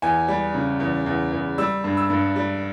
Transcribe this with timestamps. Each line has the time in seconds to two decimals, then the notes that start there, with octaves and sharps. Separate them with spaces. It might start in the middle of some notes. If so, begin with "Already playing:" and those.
0.02 E2 G#5
0.28 G3
0.54 C#3
0.80 E2
1.06 E2
1.32 E2
1.58 G3 E6
1.84 G2
1.97 E6
2.10 G2
2.36 G3